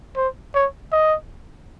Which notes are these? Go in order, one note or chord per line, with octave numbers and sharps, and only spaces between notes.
C5
C#5
D#5